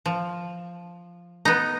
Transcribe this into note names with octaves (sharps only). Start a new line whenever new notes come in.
F3
B3 D#4